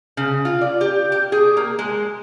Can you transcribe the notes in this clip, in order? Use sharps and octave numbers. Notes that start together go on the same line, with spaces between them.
C#3
F4
D5
G4
G4
G#4
A#3
G#3